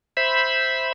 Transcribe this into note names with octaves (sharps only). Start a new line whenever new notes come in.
C5 E5 B5